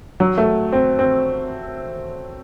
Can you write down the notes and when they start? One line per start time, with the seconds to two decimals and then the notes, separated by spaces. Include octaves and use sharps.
0.20 F#3
0.38 A3
0.73 C4
0.99 C4